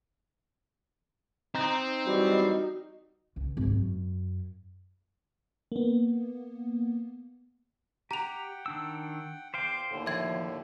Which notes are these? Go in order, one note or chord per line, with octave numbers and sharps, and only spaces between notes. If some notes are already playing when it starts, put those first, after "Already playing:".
C4 D#4 A#5
E3 F#3 G3 F#4
C#2
G#1
F#2
A#3 B3
G4 F#5 G5 A#5 F7
D#3 D4 E6
E2 C5 F5 G5 D6 G6
D#2 A2 D3
F3 E5 G#6